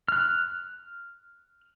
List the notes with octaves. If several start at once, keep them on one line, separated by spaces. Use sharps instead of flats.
F6 F#6